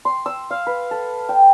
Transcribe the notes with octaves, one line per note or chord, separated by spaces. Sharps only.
C6
E6
F5
B4
A4
G5